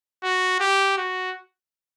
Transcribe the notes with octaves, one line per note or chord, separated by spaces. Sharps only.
F#4
G4
F#4